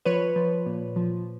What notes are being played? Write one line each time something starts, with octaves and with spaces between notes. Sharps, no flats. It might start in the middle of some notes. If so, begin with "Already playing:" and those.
F3 B4 C#5
F3
A#2
F3